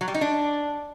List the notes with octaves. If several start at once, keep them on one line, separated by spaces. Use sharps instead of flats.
F#3
G3
D#4
D4